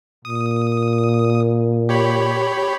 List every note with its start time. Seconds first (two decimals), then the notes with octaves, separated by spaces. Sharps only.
0.25 A#2 D#6
1.89 G4 C#5 B5